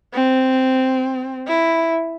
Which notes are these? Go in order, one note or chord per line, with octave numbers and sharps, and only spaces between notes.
C4
E4